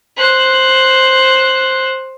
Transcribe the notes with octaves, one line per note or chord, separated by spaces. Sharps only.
C5 F#6